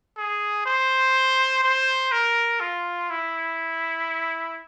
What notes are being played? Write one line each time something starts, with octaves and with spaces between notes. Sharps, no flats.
G#4
C5
C5
A#4
F4
E4